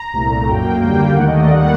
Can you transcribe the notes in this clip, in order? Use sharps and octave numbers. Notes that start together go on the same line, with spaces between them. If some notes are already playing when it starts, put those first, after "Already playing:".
Already playing: A#5
C2 A#2 A3
F#2 F#3 A#3 G5
D#2 D3 G3 A#3 G5
D#2 D#3 A3 F#5
D#5
D5
D#3 G3 A#3 F#5